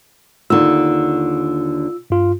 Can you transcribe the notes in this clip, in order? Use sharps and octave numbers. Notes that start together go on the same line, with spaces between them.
D#2 D3 F4 E6
G2 F4